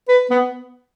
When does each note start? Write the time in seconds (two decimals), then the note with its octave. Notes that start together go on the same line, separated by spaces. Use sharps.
0.08 B4
0.30 B3